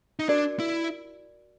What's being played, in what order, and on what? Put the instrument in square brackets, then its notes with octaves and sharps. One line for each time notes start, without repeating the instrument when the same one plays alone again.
[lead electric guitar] D#4
[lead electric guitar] D4 [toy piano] F#4 A#4 D5
[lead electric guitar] E4